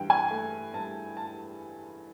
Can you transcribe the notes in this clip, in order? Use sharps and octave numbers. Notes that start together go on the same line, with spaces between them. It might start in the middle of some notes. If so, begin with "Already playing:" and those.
Already playing: G2 E3 G5
G#5
A3
G2 A5
A5